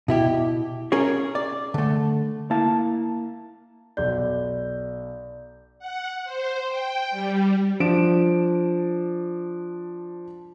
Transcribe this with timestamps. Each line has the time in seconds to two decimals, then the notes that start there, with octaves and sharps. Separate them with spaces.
0.08 B2 E4 G4
0.92 C#4 G#4 A#4 C#5
1.35 D5
1.74 D3 A3
2.50 A#3 E4 F5 A5
3.97 B1 D5 G6
5.79 F#5
6.24 C5
6.69 G5
7.11 G3
7.80 F3 D4 D7 E7